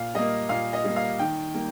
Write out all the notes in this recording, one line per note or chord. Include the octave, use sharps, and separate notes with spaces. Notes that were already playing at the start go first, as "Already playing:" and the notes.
Already playing: A#2 F5
G3 A#3 D#5
A#2 F5
D#5
G3 A#3
F5
D#3 G5
G3 A#3